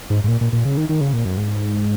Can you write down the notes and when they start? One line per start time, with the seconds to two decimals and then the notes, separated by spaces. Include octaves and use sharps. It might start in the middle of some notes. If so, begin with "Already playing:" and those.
0.10 G#2
0.24 G#2
0.28 A#2
0.41 A#2
0.53 A#2
0.65 C#3
0.77 D#3
0.89 D#3
1.01 C#3
1.13 A#2
1.25 F#2
1.37 G#2